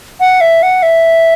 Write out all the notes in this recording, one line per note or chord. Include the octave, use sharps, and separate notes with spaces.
F#5
E5
F#5
E5